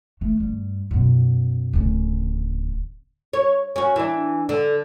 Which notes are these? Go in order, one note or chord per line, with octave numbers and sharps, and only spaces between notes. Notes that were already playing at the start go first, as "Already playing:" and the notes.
A3
G2
F#2 B2
D1 C#3
C#5
C#4 F#4
E3 D4
D3